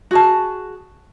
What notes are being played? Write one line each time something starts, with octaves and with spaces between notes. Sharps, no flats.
F#4 G#4 A5